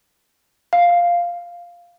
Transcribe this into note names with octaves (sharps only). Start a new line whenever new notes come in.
F5